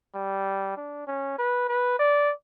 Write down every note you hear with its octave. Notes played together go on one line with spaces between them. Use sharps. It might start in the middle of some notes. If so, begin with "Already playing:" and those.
G3
D4
C#4
B4
B4
D5